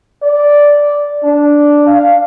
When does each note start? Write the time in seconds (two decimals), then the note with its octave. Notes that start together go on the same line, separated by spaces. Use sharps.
0.22 D5
1.24 D4
1.87 F5